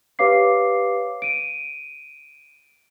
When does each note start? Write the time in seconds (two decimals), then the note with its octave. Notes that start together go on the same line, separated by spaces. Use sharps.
0.19 G4 B4 C#5 F5 D6 C7
1.22 D7 D#7